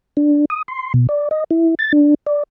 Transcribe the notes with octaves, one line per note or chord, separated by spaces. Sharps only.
D4
D#6
C6
B2
D5
D#5
E4
A6
D4
D5